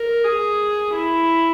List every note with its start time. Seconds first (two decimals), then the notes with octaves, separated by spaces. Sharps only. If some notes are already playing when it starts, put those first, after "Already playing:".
Already playing: A#4
0.25 G#4
0.93 E4